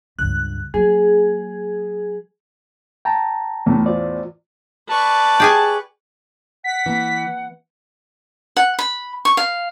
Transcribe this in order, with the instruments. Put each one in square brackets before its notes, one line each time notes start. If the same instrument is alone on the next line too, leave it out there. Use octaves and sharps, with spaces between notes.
[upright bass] C#2 G2 [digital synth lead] F#6
[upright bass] F#3 A#3 [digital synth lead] G#4
[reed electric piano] G5 A5 A#5
[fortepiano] E2 A2
[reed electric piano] F4 C5 D5
[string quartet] B4 D5 C#6 [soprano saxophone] A5
[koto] G4 G#4 G#5
[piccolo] F#5 [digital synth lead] B6
[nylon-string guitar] E3 [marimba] A#3 C4
[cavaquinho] F#5
B5
C#6
F5